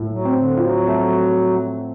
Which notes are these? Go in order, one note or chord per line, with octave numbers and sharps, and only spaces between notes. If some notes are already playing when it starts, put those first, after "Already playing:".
Already playing: A2 A3
F#3
C4
D3
F3 F#3
A3